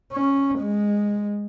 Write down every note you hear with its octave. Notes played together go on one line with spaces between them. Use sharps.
C#4
G#3